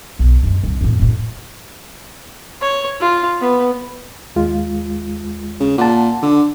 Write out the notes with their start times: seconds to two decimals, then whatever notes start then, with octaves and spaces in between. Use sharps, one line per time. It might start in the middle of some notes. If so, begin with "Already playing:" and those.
0.19 B1
0.43 F#2 G#3
0.64 C2
0.81 F2 A2
1.00 F2 A2
2.62 C#5
3.00 F4
3.40 B3
4.36 D#2 G#3 F4
5.60 C#3
5.78 A#2 F#5 A5
6.22 D3